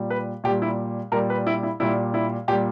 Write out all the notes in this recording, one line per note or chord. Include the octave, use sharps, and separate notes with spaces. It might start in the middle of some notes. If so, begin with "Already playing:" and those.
Already playing: A#2 G3
B4
A#2 G3 G4
E4
A#2 G3 A#4
B4
E4
E4
A#2 G3 E4
E4
A#2 G3 G4